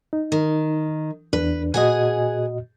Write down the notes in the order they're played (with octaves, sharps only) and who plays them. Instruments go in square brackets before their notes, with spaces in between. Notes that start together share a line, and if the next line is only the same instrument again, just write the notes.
[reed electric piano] D#4
[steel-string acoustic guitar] D#3
[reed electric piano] E2 D4 [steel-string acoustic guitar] B4
[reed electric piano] A#2 F#4 D#5 [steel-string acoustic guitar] G#4 F#5 G#5